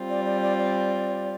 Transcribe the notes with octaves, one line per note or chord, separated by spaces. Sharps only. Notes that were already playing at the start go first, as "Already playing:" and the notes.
Already playing: G3 C4 F4
D5
D5
D5
D5